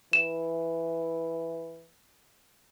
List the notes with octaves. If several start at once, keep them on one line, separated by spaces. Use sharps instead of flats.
E3 E7